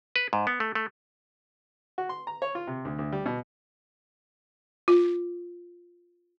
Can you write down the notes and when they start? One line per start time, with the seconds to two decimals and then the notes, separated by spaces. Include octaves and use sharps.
0.16 B4
0.33 G#2
0.47 B3
0.60 A3
0.75 A3
1.98 F#4
2.09 C6
2.27 A#5
2.42 C#5
2.55 F4
2.67 C3
2.85 D2
2.99 D2
3.12 G3
3.26 B2
4.88 F4